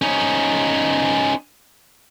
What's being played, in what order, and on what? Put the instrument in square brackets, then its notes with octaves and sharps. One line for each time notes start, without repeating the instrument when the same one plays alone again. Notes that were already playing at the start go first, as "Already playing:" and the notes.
[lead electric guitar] C#4 D#4